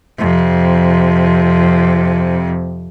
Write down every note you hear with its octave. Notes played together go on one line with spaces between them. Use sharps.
F2 C3